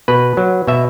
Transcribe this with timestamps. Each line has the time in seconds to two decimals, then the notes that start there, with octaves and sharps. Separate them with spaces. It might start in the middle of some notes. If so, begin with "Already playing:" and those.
0.08 B2 B4
0.37 F#3
0.67 B2 E5